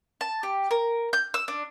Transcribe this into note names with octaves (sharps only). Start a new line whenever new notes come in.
A5
G4
A#4
G6
E6
D4